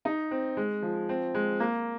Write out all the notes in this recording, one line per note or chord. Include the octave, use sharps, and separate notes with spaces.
D#4
C4
G#3
F3
C4
G#3
A#3